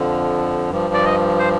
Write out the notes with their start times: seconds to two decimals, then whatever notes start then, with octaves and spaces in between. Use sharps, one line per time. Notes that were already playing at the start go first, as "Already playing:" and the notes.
Already playing: F2 D3 F3
0.71 G2 F3
0.94 D5
1.05 D#5
1.39 C5